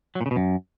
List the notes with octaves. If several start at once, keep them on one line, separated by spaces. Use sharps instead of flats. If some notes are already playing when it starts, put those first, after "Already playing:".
F#3
A#2
C#3
B2
F#2